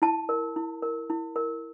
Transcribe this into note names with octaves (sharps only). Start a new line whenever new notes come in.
E4 A5
A#4
E4
A#4
E4
A#4